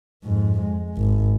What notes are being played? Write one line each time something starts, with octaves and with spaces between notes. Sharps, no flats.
F2 G#2
G#3
G#1